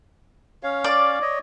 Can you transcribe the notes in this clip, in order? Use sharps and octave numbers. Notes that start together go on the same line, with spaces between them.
C#4 C#5 F5
D5
C#5 D#5